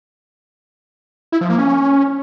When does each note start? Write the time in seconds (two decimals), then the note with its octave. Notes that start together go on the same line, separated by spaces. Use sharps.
1.32 E4
1.41 F3
1.50 A#3
1.58 C#4